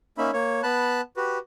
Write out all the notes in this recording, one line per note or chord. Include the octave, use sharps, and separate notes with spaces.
A#3 C#4 D#4 E5 B5
A#3 C#5
B3 A5 B5 F#6
F#4 G4 B4